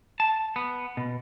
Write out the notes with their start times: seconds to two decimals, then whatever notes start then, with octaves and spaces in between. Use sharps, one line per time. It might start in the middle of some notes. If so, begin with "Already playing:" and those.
0.20 A5
0.56 B3
0.97 B2